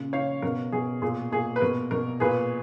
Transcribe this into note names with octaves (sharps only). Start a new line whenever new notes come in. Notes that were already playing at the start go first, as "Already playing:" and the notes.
Already playing: A#2 C#3
C#3 C#5 F5
B2 A#4
B2 G#4
A#2 G#4
A#2 G#4
B4
B2 A#4
B2 A#4
A#2 G#4 B4